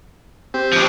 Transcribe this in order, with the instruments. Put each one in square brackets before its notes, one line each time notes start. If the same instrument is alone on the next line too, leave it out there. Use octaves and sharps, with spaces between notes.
[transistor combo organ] C4 G4
[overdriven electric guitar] F3 D4